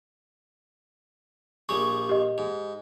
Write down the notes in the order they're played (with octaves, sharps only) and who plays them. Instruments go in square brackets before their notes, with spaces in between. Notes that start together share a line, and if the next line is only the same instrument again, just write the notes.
[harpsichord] A#1 G3 G#4 [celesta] C#6
[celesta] G4 D#5
[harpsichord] G#2